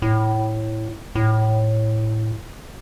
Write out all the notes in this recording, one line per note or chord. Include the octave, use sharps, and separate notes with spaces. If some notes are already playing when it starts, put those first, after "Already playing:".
A2
A2